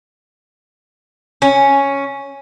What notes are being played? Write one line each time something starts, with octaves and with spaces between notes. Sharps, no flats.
C#4